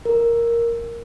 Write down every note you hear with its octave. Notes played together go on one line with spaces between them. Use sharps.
A#4